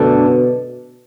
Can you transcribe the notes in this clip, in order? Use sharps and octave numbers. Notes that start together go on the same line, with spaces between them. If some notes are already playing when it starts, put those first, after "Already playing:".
Already playing: F#2 B2 D3 A3 D4